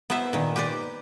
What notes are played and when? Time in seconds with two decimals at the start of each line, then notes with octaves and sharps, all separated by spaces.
0.10 B3 E4 B4 C5 E5
0.33 A#2 D#3
0.56 G4 B4 C5 D5